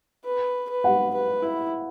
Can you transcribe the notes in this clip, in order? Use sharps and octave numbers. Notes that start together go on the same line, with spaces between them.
B4
B4
F#5
B4
E4